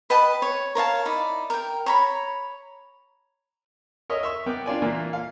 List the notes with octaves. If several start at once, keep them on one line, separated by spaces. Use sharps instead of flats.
B4 D#5 G5 A5
C#5
A#4 C#5 F5 A5
D#4 E4 D5
A#4 G5
C#5 A#5 B5
A#4 C#5 D#5 E5
E5 C#6
B3 A#4 G5 D6
D4 F4 D5 G#5
A#2 E3 A#3
F5